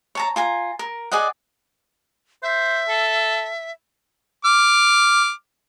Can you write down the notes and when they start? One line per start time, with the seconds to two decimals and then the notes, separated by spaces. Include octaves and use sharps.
0.15 C#5 A5 A#5
0.36 F4 G#5 A#5
0.79 A#4
1.12 G#4 D5 D#5 F#5
2.43 C5 E5
2.89 A4
4.45 D6 F6